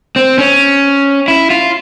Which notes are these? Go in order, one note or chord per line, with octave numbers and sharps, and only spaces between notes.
C4
C#4
E4
F4